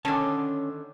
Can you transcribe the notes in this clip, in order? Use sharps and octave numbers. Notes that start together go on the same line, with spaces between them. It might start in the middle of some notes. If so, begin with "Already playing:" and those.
D3 D#3 C#4 A5